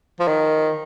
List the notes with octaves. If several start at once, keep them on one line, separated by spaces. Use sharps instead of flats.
F3
D#3